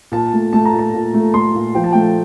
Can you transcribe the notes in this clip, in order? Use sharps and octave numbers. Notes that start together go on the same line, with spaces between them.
A#2 A5
A3
A3 A5
A#5
A#2
A5
A#2
A3
A3 C6
A#2
F3 G5
A5
A3 G5